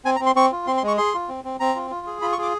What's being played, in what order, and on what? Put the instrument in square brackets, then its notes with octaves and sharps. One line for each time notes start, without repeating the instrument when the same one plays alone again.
[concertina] C4 G#5
A#5
C4
C6
C4 C#6
F4
C4 C6
C6
G#3
C#6
G#4 C6
F4
C4
C4
C4 A#5
F4
F4
G#4
F4 B5
C#6
G#4 D6